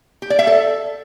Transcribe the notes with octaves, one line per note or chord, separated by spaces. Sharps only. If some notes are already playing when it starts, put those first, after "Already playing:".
G4
D5
E5
A4